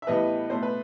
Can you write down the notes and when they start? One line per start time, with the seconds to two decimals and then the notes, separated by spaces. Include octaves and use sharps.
0.02 E5
0.07 A2 E3 G3 B3 B4 D#5
0.49 B2 A3 C5
0.63 B4